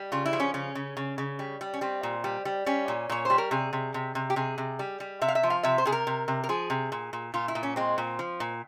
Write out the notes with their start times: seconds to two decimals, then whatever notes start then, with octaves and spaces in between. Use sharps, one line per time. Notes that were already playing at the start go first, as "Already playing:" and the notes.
Already playing: G3
0.12 C#3 F4
0.26 E4
0.33 F3
0.40 C#4
0.54 C#3 C#4
0.75 C#3
0.97 C#3
1.18 C#3
1.39 G3
1.61 G3
1.74 C#4
1.81 G3 C4
2.03 A#2
2.24 G3
2.45 G3
2.66 G3 C#4
2.88 A#2
3.10 A#2 C#5
3.25 G3 C5
3.38 A#4
3.51 C3 G#4
3.73 C3
3.94 C3
4.15 C3
4.30 G4
4.36 C3 G#4
4.58 C3
4.79 G3
5.00 G3
5.22 C3 E5
5.28 F5
5.35 E5
5.43 F3
5.50 F5
5.63 C3 E5
5.78 C5
5.85 C3 G#4
5.92 A#4
6.07 C3
6.28 C3
6.44 A#4
6.49 F3 G#4
6.70 C3
6.92 A#2
7.13 A#2
7.34 A#2 F4
7.48 E4
7.55 A#2
7.63 C#4
7.76 G#3 C4
7.98 A#2
8.19 F3
8.40 A#2